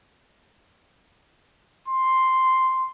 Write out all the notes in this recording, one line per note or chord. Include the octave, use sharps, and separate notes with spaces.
C6